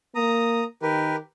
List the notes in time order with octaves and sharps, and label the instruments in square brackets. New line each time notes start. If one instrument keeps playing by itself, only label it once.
[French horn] A#3 [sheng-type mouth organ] A#5 D#6
[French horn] D#3 [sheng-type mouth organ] G4 A#4 B4